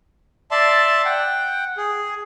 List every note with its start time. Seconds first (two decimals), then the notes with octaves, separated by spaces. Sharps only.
0.51 D5 E5 A5 C6
1.05 F#5 G5
1.77 G#4